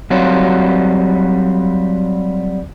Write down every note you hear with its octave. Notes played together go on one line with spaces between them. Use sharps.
F#3 G3 C4 F4 F#4 C#5